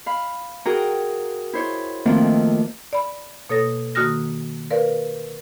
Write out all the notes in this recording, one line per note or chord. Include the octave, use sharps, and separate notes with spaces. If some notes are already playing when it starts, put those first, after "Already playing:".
F5 B5
F#4 G#4 A#4 G5 A#5
E4 C5 C#5
D#3 F3 A3 A#3 C4
D5 B5
B2 A#3 A4 C#5 D#6 A#6
D#3 A#3 F#4 D#6 F6 A#6
A#4 B4 D5 F5